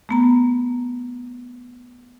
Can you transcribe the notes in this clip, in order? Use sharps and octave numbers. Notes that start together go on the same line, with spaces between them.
A3 B3 A#5